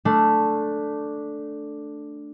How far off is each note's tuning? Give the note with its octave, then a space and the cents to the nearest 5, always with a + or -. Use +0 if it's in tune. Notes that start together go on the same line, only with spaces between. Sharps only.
A3 +0 D4 +0